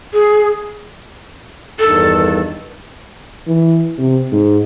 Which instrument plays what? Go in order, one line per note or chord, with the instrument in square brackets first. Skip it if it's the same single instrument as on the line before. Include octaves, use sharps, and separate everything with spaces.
[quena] G#4
[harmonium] E2 G2 D#3 [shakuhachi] A4
[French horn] E3
C3
G#2